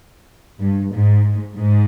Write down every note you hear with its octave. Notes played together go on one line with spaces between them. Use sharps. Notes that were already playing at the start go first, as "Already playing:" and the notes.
G2
G#2
G#2